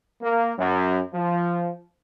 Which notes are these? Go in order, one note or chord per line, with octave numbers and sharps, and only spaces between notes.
A#3
F#2
F3